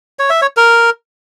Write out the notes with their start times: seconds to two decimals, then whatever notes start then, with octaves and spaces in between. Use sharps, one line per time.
0.19 C#5
0.30 E5
0.42 C#5
0.57 A#4